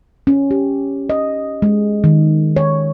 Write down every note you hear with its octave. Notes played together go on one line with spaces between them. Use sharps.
C#4
G4
D#5
G#3
D#3
C#5